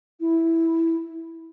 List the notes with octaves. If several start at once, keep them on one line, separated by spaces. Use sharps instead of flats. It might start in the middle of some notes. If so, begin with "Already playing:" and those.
E4